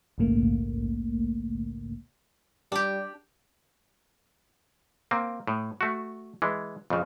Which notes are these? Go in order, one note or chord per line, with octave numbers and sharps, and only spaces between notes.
A#1 D#2 G#2 C#3 A3 A#3
G3 D4 G4
A#3 C4
A2
A3 F#4
E3 G#3
F2 C#3